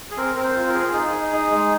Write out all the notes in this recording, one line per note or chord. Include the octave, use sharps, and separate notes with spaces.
G#4
C4 A#4
C4 A#4
C5
F4
A#4
G#4
D#4 G#4
D#4
D#4
G#3